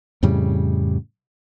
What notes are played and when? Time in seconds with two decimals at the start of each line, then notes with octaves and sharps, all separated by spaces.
0.23 F2 A2 C#3 G3